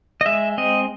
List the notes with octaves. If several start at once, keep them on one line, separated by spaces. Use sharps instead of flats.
D#5
G#3 E5
C4 D#5